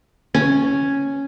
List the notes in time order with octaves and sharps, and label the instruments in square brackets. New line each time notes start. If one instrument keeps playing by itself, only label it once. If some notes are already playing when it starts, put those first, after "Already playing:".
[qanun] C#4